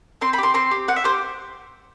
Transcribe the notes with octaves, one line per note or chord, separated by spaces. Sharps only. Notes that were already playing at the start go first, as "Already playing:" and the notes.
C4 C6
B5
G4
C6
C4 C6
G4
C4 F#5
E5
G4 C5